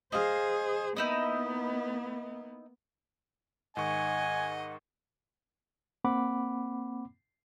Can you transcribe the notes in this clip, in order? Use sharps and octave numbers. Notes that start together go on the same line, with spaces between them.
G#4 C5 D#5 F5
A#3 B3 D#4 E4 D#5
G#2 D#3 D#5 F#5 G#5 C#6
A#3 C4 F#5 B5 D6